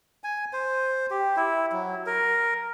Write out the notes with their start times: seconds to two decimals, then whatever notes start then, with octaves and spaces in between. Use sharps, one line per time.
0.24 G#5
0.53 C5
1.10 G4
1.36 E4
1.72 F#3
2.06 A#4